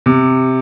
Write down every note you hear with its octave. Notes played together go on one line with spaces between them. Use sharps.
C3